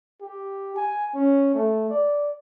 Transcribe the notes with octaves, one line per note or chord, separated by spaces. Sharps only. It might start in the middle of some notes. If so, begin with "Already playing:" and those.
G4
G#5
C#4
A3
D5